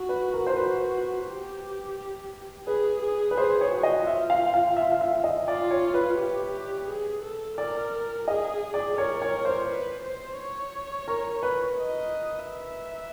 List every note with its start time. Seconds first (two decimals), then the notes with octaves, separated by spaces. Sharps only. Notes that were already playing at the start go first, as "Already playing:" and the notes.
Already playing: F#4
0.09 B4
0.34 A#4
0.47 C5
0.56 F#4 B4
1.27 G4
2.66 G#4 B4
3.02 G#4
3.31 B4
3.37 G#4 C5
3.61 C#5
3.72 F#4
3.83 D#5
4.07 F4 E5
4.30 F5
4.54 F5
4.77 E5
4.92 F5
5.01 E5
5.24 D#5
5.48 F4 D5
5.71 C#5
5.94 B4
6.18 G4
6.52 G4
6.88 G#4
7.23 A4
7.58 A#4 D5
8.28 G#4 D#5
8.74 D5
8.98 A#4 C#5
9.22 C#5
9.45 C5
9.67 B4
10.03 C5
10.38 C#5
11.08 A#4
11.43 B4
11.78 D#5
12.48 E5